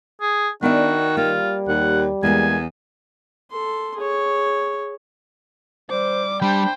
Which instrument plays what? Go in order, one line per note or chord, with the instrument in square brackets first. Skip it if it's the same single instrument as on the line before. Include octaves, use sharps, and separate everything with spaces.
[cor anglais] G#4
[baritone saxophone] D#3 [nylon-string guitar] B3 D5 E5 [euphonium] D4 [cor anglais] F#4
[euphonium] G3 [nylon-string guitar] A#3 [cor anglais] F4
[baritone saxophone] D#2 [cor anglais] F#5
[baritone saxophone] E2 [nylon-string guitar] G#3 A#3 [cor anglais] G#5
[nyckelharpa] A4 C6
G#4 C#5
[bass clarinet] G3 [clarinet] C5 [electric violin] D6
[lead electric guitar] G3 [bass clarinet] D4 [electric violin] C5 G5 [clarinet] B5